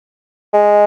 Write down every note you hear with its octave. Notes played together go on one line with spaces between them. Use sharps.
G#3